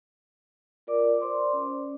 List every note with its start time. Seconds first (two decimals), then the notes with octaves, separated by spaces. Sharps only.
0.87 F4 A#4 D5 D6
1.21 C5 D5 C6 D6
1.53 C#4